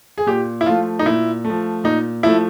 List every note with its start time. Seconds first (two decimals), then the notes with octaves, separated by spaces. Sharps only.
0.18 G#4
0.27 A#2 G4
0.61 E4
0.66 F3 A3 F4
0.99 D#4
1.06 A#2 E4
1.45 A3
1.50 F3
1.84 A#2 D#4
2.23 F3 A3 E4